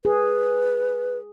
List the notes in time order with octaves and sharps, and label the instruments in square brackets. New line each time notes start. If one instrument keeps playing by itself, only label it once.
[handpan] G#4 [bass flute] B4